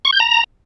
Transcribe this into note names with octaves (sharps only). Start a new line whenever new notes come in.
C#6
G6
A#5